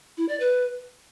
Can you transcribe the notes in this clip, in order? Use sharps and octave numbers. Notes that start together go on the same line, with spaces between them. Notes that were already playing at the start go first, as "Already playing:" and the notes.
E4
D5
B4